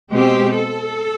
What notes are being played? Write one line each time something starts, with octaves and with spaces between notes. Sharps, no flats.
B2 G#3 C4 G4
A4